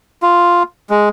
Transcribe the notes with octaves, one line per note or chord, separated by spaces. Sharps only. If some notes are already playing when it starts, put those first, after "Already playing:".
F4
G#3